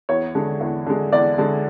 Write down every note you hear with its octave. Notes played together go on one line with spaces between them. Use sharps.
E2 C#5
D3 G#3
E2
D3 G#3
E2 D5
D3 G#3